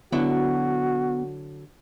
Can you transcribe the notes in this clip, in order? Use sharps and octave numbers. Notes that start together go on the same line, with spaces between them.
D3 F#3 B3 E4 F#4